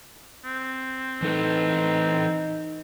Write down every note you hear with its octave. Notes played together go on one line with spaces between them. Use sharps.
C4
E3 D#4 A4 B4